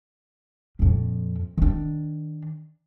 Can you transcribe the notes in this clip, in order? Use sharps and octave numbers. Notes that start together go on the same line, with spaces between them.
F2 A#2
D#3 D4